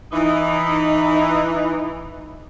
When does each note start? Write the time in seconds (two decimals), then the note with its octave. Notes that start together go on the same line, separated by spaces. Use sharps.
0.12 E3 D#4